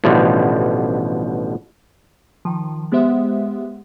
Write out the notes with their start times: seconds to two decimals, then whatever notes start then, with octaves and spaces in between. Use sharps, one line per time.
0.04 A1 B2 D3 F3 G3
2.45 D#3 F3
2.92 G#3 B3 G4 C5 E5 F#5